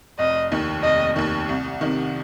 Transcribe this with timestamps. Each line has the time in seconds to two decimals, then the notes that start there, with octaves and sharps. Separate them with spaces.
0.19 F1 D#5
0.52 D#2 D#3
0.83 F1 D#5
1.16 D#2 D#3
1.49 C2
1.81 C3 D#3